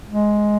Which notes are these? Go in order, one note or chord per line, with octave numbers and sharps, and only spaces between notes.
G#3